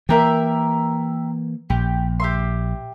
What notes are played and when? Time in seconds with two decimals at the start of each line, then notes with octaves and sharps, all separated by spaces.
0.09 E3 A#3 G4 A#4 E5
1.70 A#1 G4
2.20 G4 E5 C6